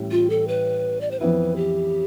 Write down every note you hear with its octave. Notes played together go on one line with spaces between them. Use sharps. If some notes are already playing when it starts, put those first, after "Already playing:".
Already playing: A1 A2 E3 G3
F4
A4
B4
D5
C5
F2 E3 B3 E4 B4
G4